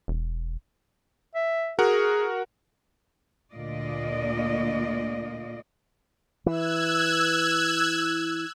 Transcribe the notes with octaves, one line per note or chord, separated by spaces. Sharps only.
E1
E5
F#4 G#4 A#4 F#5
D2 A#2 D3 F4 D5 D#5
E3 E6 F#6 G#6